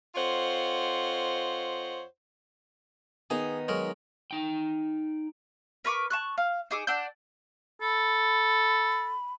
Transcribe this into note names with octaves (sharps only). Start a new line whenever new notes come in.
F2 F4 C5 C#5 D#5 F#5
D#3 B3 D#4 G#4
F#3 G#3 A#4
D#4 G5
A#4 B4 C#6 D6
A5 C#6 F#6
F5
D#4 G#4 D6 E6
D4 F#5 E6 G6
A4 B5